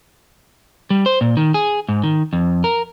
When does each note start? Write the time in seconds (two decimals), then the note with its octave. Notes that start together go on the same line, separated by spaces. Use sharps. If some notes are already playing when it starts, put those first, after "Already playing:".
0.90 G3
1.06 C5
1.21 A#2
1.37 D#3
1.54 G#4
1.89 G#2
2.04 D#3
2.33 F2
2.64 A#4